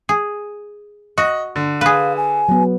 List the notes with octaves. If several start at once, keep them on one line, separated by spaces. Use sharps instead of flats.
G#4
F#4 D#5
D3
G#4 B4 F5
G#5
F#3 B3